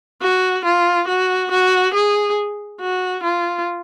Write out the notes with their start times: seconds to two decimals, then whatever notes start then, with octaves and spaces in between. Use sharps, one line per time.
0.22 F#4
0.65 F4
1.08 F#4
1.51 F#4
1.94 G#4
2.80 F#4
3.23 F4